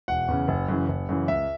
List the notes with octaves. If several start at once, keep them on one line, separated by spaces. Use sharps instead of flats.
E1 F#5
E2 C#3
F#1
F#2 C#3 E3
F#1
F#2 C#3 E3
C#2 E5